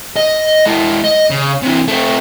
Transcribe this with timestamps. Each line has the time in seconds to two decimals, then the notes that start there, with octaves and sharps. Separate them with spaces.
0.16 D#5
0.66 G#3 E4
1.04 D#5
1.30 C#3
1.62 C3 E3
1.88 A3 C4